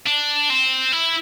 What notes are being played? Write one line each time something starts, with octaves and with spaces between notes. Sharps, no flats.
D4
C4
E4